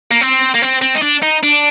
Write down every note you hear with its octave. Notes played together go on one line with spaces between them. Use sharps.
A#3
C4
A#3
C4
C4
D#4
D4
D#4
D4